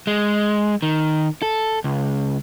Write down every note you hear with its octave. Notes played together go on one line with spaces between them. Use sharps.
G#3
D#3
A4
C#2